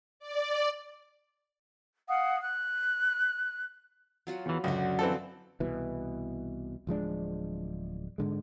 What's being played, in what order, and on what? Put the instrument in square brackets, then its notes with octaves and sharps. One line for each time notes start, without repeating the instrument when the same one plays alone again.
[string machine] D5
[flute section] F5 F#5 D#6
F#6
[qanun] F#3 F4 F#4
[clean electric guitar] E2 E3
[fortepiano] C#2 [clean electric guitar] F#2 [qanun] D3 F#4
[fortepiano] E3 C4 A4 [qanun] F3
[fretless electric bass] C2 B2 E3
D1 F3 G#3 D4
G#2 D3 G#3